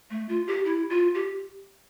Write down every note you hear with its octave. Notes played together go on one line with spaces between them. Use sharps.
A3
F4
G4
E4
F4
G4